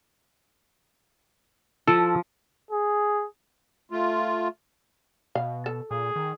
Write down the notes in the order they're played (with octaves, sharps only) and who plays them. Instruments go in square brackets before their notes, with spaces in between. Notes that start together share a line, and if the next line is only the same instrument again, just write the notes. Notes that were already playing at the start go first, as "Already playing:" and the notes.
[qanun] F3 [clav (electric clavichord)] A4
[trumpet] G#4
[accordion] A3 F4
[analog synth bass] B2 [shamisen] F5
[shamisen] A4
[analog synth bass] A#2 [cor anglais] G#4
[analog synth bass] D#3